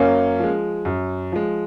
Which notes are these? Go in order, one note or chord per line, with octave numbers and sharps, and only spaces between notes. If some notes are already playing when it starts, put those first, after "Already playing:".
Already playing: F#2 A#3 C#4
F3 G#3
F#2
F3 G#3